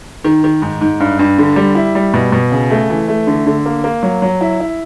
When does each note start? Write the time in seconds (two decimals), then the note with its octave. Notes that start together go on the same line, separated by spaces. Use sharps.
0.24 D#3
0.44 D#3
0.62 G#2
0.81 G#2
1.00 G2
1.19 G2
1.38 D3
1.56 G3
1.75 E4
1.95 G3
2.14 B2
2.32 B2
2.51 C#3
2.70 A3
2.90 E3
3.08 A3
3.27 D3
3.46 D3
3.66 A#3
3.84 A#3
4.03 F#3
4.22 F#3
4.41 E4
4.60 E4